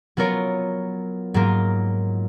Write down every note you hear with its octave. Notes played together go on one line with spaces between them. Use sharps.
F#3 B3 F4 A#4 C#5
G#2 F#3 A#3 F4 A#4